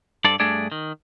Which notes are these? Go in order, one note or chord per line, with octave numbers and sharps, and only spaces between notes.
G2 A4 C5 D5
G2 A3 D4 G#4 D5
D#3